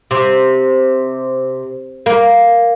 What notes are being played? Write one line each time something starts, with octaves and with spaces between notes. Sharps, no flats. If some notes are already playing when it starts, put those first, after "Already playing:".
C3
A#3